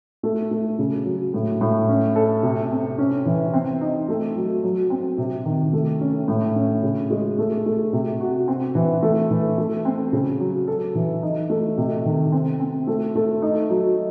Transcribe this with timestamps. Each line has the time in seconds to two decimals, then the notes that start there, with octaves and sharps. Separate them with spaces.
0.23 A3
0.51 A3
0.79 C#3
1.06 F#3
1.34 A2
1.61 A2
1.89 C#4
2.16 A4
2.43 C3
2.71 C4
2.98 C#4
3.26 E3
3.53 C4
3.81 D#4
4.09 A3
4.36 F#3
4.63 F#3
4.90 C4
5.18 C3
5.45 D#3
5.73 A3
6.01 C#4
6.28 A2
6.56 C#4
6.83 C#3
7.10 G#3
7.38 A3
7.66 A3
7.93 C3
8.20 F#4
8.48 C4
8.75 E3
9.02 A3
9.31 E3
9.58 A3
9.85 C4
10.13 C#3
10.40 F#3
10.68 A4
10.95 E3
11.22 D#4
11.50 A3
11.77 C3
12.05 D#3
12.32 C4
12.60 C4
12.87 A3
13.15 A3
13.42 D#4
13.70 F#3